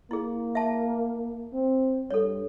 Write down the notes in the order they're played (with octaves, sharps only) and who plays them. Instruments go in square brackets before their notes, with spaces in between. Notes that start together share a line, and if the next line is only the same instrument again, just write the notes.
[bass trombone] A#3 [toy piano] E4 G#4
[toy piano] E5 A5
[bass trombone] C4
[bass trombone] G2 [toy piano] A4 C#5